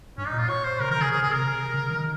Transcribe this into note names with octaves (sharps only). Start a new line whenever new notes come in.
G2 C#4
D#4
A#2
F4
C#5
C5
C3 A#4
D#3 A#4
C#3 G#4
C3 G#4
G#4
C3 A#4
C#3
D#3